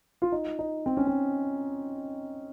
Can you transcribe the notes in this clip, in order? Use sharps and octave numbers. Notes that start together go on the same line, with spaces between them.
F4
D#4
D#4
C4
C#4
C4